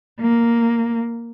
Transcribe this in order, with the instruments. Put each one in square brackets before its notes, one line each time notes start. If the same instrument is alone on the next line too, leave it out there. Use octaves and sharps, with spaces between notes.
[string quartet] A#3